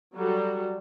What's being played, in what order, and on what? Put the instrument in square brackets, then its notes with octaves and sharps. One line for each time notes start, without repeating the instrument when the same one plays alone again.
[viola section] F#3 G3 F#4 A4